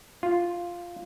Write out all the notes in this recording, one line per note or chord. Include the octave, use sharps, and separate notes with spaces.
F4